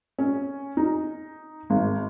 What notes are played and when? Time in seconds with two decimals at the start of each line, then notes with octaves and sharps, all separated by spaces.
0.19 C#4
0.77 D#4
1.70 G#1